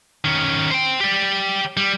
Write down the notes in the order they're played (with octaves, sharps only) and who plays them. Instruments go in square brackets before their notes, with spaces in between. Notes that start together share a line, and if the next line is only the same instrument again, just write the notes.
[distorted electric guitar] D#3 C#4
C5 G5
G4 D5
G3